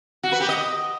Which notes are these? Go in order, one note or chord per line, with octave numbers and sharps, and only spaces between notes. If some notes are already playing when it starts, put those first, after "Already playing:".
F#4
B4
G4
D#5